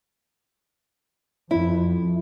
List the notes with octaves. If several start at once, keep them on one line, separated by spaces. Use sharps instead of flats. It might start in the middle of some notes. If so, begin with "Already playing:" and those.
F2 E4